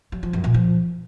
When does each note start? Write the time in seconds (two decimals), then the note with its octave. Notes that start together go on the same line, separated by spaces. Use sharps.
0.12 F#3
0.23 F3
0.33 F#2
0.44 A#2
0.54 F3